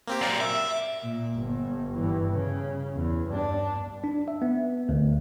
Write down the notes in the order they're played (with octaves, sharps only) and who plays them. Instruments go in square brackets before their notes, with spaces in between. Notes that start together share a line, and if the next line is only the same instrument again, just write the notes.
[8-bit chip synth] A#3 C4 G4
[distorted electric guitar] F#2 A#2 [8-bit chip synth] A#4 D5
[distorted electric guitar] E5 [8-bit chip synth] D6
[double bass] A#2
G1 G2
G2 E3
C#3
E2
G2 D4
[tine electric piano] D4
E5
B3
D2